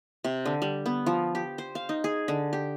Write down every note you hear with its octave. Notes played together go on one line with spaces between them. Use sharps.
C3
D3
G3
B3
F3
G4
C5
F5
D#4
G#4
D3
G4